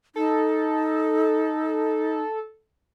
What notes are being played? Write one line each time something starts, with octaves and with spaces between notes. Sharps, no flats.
D#4 A4